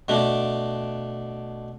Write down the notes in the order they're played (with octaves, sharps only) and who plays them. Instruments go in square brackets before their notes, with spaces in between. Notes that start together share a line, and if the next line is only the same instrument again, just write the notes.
[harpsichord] B2 A3 D4